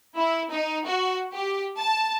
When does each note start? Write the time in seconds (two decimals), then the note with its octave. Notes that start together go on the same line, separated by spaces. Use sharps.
0.17 E4
0.53 D#4
0.86 F#4
1.34 G4
1.78 A5